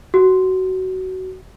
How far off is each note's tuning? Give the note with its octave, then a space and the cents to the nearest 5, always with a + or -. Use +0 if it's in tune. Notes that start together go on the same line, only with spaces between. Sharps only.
F#4 +15